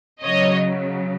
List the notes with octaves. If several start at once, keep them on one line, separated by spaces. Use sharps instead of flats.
C#3 F#3 C#5 D#5